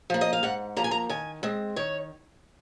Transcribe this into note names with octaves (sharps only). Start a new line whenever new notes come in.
F3 A#3
D#5
F5
G#2 F#5
F3 A#3 A#5
G#5
A#5
D#3 G#5
G#3 C4
D#3 C#5